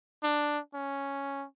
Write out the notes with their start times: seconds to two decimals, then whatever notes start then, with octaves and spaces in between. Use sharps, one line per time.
0.23 D4
0.74 C#4